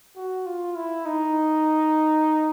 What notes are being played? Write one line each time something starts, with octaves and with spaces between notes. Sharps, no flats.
F#4
F4
E4
D#4